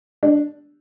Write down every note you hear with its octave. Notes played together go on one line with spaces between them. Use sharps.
D4